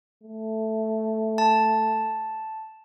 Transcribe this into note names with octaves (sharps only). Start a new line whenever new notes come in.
A3
A5